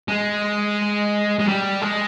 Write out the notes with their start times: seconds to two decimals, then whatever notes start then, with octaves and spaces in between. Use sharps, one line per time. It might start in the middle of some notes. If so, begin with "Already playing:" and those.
0.08 G#3
1.40 G#3
1.48 G3
1.82 G#3